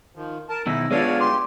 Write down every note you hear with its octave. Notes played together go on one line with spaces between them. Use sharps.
D#3 F3
A#4 A5
B2 D#3 E4 E6 A#6
G#3 B3 D4 F4 B4 C#5 D5 F5
G4 C6 D6